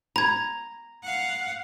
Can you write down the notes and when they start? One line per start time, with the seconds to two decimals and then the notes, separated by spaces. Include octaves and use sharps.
0.16 A#5 B5 G#6
1.03 F5 F#5